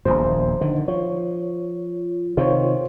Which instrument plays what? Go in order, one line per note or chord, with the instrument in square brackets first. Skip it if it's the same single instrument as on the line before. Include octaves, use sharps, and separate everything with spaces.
[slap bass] D#1 A#1 E2 [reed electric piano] C5
[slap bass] D3 D#3
[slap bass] F3 [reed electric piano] C#5
[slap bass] C3 D#3 [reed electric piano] F4 C5 C#5